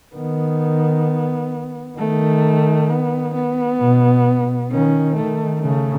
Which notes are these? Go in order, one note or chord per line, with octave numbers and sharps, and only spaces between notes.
D#3 B3
D#3 A3
B3
B3
B2
D#3 C#4
D#3 A3
C#3 A3